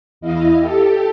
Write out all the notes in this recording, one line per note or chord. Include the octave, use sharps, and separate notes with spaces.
E2 E4 D#5 F5
G4 A4